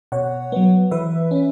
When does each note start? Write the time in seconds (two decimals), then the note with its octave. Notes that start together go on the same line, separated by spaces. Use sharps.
0.12 B2 C#5 F#5
0.52 F#3 B3
0.91 E3 B4 E5
1.31 C#4